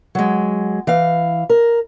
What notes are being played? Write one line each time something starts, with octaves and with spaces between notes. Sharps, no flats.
F#3 G#3
E3 F5
A#4